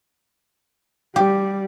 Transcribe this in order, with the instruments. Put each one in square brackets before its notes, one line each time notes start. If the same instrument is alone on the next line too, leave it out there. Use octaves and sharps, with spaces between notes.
[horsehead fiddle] G3 [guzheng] G4